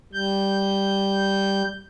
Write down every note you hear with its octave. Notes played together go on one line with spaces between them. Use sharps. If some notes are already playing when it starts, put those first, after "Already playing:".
G3 G6